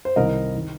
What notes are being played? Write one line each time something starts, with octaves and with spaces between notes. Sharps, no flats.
C5
C2 C3 D#3 A#4 D#5
D#3